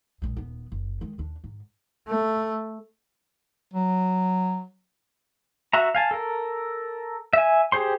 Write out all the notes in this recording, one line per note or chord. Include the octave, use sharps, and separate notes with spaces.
A#1 G#3
D#1 B3
F#1
D#3 G#3
D#2 D4
G#2
A3
F#3
F#4 E5 A#5
F5 G#5 A5
A4 A#4
E5 G#5
G4 G#4 C5 C6